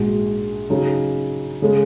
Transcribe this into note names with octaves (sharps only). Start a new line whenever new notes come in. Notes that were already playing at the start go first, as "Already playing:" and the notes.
Already playing: A#1 G#2 G#3 F#4
C#3 F#3 D#4
C#3 G#3